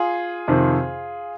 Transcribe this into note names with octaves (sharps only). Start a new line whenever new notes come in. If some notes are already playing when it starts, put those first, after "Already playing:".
Already playing: F4 G#4
F2 C3 D#3